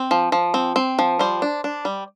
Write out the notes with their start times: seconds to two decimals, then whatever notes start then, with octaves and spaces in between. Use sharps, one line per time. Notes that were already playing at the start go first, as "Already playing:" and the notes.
Already playing: C4
0.11 F3
0.32 F3
0.54 C4
0.76 C4
0.99 F3
1.19 G3 C5
1.42 D4
1.64 D4
1.85 G3